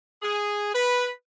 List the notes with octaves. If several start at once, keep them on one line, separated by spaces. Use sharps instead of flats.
G#4
B4